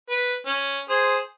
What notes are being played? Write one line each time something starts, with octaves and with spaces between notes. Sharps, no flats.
B4
C#4
G#4 C5